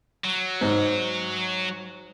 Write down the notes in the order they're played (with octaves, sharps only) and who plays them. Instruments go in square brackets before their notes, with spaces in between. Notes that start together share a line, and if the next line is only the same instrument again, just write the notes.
[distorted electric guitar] F#3
[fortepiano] G#2